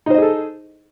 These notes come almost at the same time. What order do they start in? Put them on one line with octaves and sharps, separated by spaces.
D#4 C5 D#5 G#4 A4